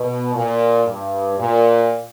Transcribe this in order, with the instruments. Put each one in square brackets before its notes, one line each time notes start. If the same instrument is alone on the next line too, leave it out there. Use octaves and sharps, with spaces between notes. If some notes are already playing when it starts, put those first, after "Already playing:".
Already playing: [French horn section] B2
A#2
G2
A#2